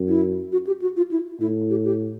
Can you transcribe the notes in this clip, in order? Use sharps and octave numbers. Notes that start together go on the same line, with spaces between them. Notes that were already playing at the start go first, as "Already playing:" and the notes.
Already playing: F#2
E4
F#4
G4
F#4
F4
E4
A2 E4
G4
G4